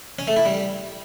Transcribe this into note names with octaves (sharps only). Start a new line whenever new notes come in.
C#4
A3
E4
G3